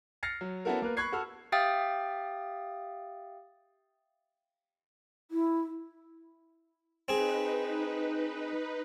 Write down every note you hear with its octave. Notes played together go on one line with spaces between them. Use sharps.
F6 A6 A#6 C7 C#7
F#3
B3 C#4 E4 F#4 A4 A#4
A#3 A#4 B4
B5 C#6 F#6 G#6 C7
F#4 A4 E6 F6
G4 E5 F5 G5 D#6 A6
E4
C4 D#4 G#4 B4